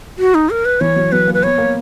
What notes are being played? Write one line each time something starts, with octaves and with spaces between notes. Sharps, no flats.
F#4
D#4
A#4
B4
E3 C#5
F#3
F#3 B4
A#3
B4
B3 C#5
A#3